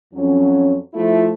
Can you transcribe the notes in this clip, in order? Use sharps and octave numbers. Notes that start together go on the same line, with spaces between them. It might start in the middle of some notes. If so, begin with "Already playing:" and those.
F2 F#3 C#4
F3 A3 E4 F4